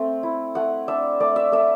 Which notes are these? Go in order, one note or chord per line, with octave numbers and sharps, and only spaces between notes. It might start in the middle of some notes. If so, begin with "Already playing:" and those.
Already playing: A3 C4
E4
A3 F#5
D4 E5
A3 D5
E5
A3 E5